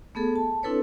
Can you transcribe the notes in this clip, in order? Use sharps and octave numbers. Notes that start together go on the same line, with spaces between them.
A3 B3 G#4 A4
A5
C4 D4 E4 A4 B4 C#5